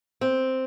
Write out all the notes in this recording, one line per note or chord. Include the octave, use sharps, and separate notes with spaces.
C4